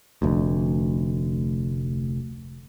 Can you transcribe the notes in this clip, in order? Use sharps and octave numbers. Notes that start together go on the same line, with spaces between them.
F1 D2